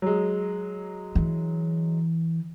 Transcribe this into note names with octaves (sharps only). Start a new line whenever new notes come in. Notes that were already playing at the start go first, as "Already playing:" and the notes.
F#3 G#3
E3